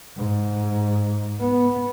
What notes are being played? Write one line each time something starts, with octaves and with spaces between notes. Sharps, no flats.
G#2
B3